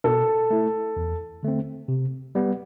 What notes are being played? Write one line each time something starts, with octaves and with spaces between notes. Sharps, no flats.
B2 A4
A3 E4
E2
D3 A3 C4
C3
G3 B3